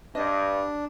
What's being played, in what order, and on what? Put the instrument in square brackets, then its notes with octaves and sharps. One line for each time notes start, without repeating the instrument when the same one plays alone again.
[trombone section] G2 [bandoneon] D4 [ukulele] D#5